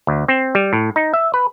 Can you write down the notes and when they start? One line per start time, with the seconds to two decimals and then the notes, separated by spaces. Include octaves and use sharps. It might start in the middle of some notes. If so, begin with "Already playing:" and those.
0.07 D2
0.28 C4
0.55 G3
0.73 A2
0.96 D#4
1.14 E5
1.34 B4